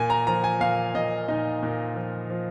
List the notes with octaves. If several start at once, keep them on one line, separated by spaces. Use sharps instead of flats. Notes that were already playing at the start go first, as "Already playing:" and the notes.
Already playing: A#2 G#5
A#5
F3 A#5
G#5
A#2 F5
A#2 D#5
A#2 D#4
A#2
F3
F3